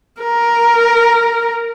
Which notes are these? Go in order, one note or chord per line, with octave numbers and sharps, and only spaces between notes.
A#4